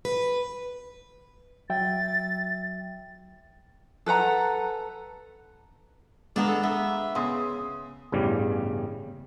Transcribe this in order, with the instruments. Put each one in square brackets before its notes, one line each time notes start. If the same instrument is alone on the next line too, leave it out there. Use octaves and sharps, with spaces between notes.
[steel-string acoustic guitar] B4
[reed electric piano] F#3 E5 G5 [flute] A6
[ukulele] A4 B4 F#5 A#5
[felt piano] G#3 [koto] A#3 B3 D4 [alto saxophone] G#4
[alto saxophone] A4
[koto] B3 [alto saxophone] E5
[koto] C#3 [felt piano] B3 C6 D#6
[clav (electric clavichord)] A1 E2 G2 C#3 G3